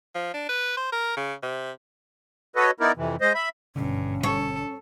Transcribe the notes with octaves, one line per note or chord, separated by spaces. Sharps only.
F3
D4
B4
C5
A#4
C#3
C3
F#4 A4 B4 C#5 D#5
B3 D#4 E4 A#4 D5
F2 C3 E3
G#3 C5 D#5
E5 B5
G#1 G2 B2 D3 C#4
A4 C#5